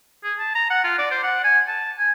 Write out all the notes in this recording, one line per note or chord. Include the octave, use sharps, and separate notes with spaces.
G#4
A5
A#5
F#5
F4
D5
C5
F#5
G#5
A5
G#5